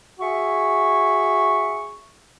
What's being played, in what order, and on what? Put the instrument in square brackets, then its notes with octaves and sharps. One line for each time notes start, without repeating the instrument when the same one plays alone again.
[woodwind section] F#4 G#4 E5 C#6